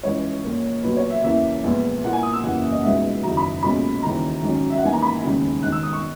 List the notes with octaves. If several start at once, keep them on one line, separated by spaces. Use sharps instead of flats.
C#2 C#3 E3 C#5
A#1 A#2 A#3
B1 A#2 F#3 B4
C#5
E5
E2 C#3 E3 A#3 E4 E5
A#1 A#2 G#3 B3
A#2 A#3 E4 F#5
G#5
D#6
E6
F#1 E2 C#3 E3 A#3 F#5
D#5
C#2 B2 G#3 D#4 E5
F#1 E2 D#3 F#3 A#5
B5
B1 A#2 G#3 C#4 B5
D#2 C#3 E3 A#5
G#1 G#2 F#3 C#4
E5
F#5
G#1 G#2 E3 A#3 E4 G#5
A#5
B5
E1 D#2 C#3
G#1 G#2 D#3 F#6
E6
D#6
C#6